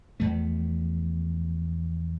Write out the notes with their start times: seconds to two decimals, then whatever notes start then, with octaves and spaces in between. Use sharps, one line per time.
0.20 E2 F3 A3